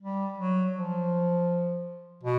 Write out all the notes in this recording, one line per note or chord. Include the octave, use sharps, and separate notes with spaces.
G3
F#3
F3
B2